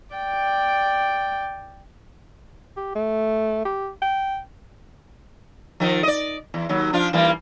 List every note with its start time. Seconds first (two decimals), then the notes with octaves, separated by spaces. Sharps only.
0.15 D5 G5
2.77 G4
2.95 A3
3.65 G4
4.02 G5
5.80 D#3 F3
6.03 D5 D#5
6.54 E2
6.69 D#2 F#3
6.93 F3 D4 F4
7.13 E3 G3 A#3